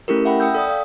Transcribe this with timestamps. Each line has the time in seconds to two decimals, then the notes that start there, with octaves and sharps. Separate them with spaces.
0.08 A3 C#4 E4 G4 A4 A#4
0.25 E5 F#5 G5 B5
0.40 G5 D#6 E6 G6
0.54 A4 D5 D#6
0.67 D5 F5